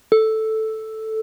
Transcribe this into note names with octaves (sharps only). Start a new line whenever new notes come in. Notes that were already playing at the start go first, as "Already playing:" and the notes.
A4